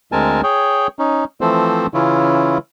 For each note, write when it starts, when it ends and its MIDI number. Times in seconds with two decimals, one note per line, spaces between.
0.12 0.41 38
0.12 0.41 56
0.12 0.41 60
0.12 0.41 70
0.12 0.41 80
0.12 0.41 81
0.43 0.87 68
0.43 0.87 73
0.43 0.87 79
0.99 1.24 61
0.99 1.24 63
1.41 1.87 52
1.41 1.87 53
1.41 1.87 57
1.41 1.87 60
1.41 1.87 69
1.41 1.87 72
1.94 2.58 49
1.94 2.58 52
1.94 2.58 61
1.94 2.58 64
1.94 2.58 65